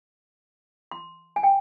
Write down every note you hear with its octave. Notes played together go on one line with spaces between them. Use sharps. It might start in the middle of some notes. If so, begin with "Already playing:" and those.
C6
G#5
G5